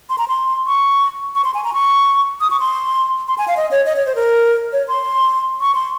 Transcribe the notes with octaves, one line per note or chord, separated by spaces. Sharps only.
C6
A#5
C6
C#6
C#6
C6
G#5
A#5
C#6
D#6
C#6
C6
C6
G#5
F5
D#5
C#5
D#5
C#5
C5
A#4
C#5
C6
C#6
C6